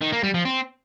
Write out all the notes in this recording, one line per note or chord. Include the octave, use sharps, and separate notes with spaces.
D#3
A#3
G3
F3
C4